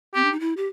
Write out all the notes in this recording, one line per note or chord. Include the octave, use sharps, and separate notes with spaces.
C4 G4
D4
D#4
E4
G4